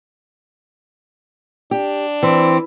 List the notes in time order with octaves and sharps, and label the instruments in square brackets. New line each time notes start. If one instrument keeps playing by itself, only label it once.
[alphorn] D4 [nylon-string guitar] G4
[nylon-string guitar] E3 [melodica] C4